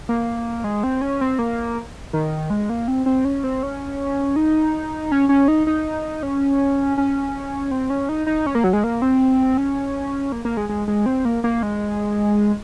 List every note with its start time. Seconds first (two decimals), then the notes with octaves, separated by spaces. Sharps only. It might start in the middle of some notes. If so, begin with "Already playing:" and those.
0.09 A#3
0.64 G#3
0.83 C4
1.01 C#4
1.21 C4
1.39 A#3
2.13 D#3
2.50 G#3
2.69 A#3
2.88 C4
3.06 C4
3.25 C#4
3.44 C4
3.63 C#4
4.36 D#4
5.12 C#4
5.29 C#4
5.48 D#4
5.67 D#4
6.23 C#4
6.98 C#4
7.71 C4
7.90 C#4
8.09 D#4
8.27 D#4
8.46 C#4
8.55 A#3
8.64 F#3
8.73 G#3
8.84 A#3
9.02 C4
9.57 C#4
10.32 A#3
10.45 A#3
10.57 G#3
10.69 G#3
10.88 G#3
11.06 C4
11.25 A#3
11.44 A#3
11.63 G#3